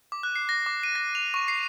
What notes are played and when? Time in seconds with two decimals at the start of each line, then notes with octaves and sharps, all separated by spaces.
0.12 D6
0.23 F#6
0.36 C7
0.49 A#6
0.66 D6
0.83 D#7
0.95 A#6
1.15 F7
1.34 C#6
1.48 C7